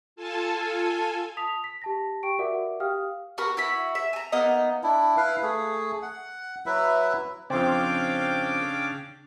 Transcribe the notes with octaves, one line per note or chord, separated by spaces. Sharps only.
F4 A4 G#5 A5
A5 D#6 B6 F7
B6
G4 A5 A#6
G4 G5 C#6 D7
F#4 A#4 D5 E5 F#5 D6
G4 F5 G5 D#6 F6
F#4 A#4 B4
E4 F#4 B5
E5
G#5 A#5
A#3 B3 D#4 D#5
D4 E4
E4 B4 F5
A3 G#4
F#5
F#3 E4 B4 E5
F2 C#3 C4 D4 F5 G5 D6